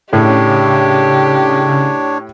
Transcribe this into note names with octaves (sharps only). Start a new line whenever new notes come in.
A2 C#3 D4 G4 C#5